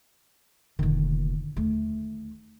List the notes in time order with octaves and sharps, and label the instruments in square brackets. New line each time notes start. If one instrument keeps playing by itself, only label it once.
[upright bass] F1 A#2 [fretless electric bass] D3 D#3
[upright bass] D#2 A3